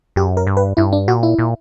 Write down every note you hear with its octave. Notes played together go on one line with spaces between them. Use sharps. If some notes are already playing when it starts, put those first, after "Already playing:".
F#2 G4
A#4
G2
B4
G2 E4
D4
A#2 F#4
E4
A#2